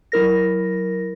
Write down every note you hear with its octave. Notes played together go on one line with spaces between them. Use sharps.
F#3 E4 A#4 A#6